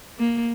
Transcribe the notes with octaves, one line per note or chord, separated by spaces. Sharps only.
A#3